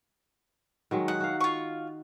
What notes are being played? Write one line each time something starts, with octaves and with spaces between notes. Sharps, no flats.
D#3 F#3 G#3
D#4 F#5
F#4 F5
F4 C#6